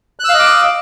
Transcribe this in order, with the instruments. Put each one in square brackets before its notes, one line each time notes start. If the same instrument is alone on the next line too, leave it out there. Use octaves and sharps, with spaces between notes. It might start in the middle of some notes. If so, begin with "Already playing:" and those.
[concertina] F#6
E6
F5
D#5
D6